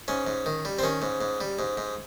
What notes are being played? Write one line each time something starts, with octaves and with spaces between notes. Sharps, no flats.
G#2 C#4
G#2
D#3
G3
C4
D#3 C#4
G#2
G#2
G3
G#2
G#2